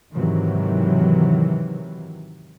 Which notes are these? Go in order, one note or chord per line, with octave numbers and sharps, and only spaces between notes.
G#2 C3 D#3 E3 F#3